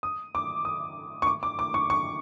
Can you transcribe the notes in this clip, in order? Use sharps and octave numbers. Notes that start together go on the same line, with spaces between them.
D#6
D6
D#6
C#6
D6
D6
D6
C#6
C#6